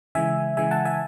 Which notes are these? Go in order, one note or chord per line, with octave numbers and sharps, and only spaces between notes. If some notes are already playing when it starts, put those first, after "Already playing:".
C#3 E3 G#3 E5 G#5
C#3 E3 G#3 E5 G#5
F#5 A5
E5 G#5